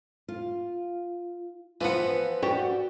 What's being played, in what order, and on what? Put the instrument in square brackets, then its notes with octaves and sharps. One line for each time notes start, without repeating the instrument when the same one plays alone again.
[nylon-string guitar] F4
[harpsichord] E3 F3 B3 [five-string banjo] F4 [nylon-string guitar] B4 F#5
[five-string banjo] F#4 G4 F#5 [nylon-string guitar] D5 G5